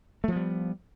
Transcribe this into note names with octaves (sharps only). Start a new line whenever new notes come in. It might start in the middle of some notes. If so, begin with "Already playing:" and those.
F3 G3 A3 B3